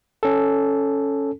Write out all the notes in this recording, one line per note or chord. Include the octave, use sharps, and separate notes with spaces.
C#4 A4